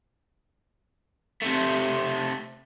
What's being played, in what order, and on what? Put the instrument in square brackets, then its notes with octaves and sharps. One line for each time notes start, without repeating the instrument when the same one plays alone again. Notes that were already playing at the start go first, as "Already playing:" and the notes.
[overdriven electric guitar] C3 A3